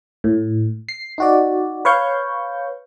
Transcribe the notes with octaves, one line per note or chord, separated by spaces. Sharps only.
A2
C7
D#4 F#4 D5
B4 C#5 F5 C#6 G6